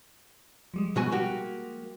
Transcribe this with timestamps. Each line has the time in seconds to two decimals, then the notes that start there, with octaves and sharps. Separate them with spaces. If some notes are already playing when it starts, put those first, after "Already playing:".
0.74 F3 G3 G#3
0.96 B2 F#4 G#5
1.12 A#3 F#4 G4